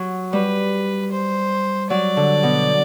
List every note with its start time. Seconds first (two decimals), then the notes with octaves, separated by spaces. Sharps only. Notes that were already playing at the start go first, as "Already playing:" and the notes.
Already playing: F#3
0.33 G3 B4
1.12 C5
1.90 F#3 D5
2.17 D3
2.43 B2